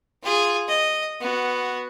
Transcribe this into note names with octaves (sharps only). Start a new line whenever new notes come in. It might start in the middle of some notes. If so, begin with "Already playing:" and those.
F4 G#4
D#5
B3 F#4